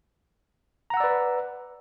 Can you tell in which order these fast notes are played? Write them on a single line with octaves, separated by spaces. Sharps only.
A#5 F#5 E6 D5 B4